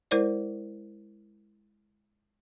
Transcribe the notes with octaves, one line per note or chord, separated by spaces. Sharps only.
G#3 E4 A#4 C5 D5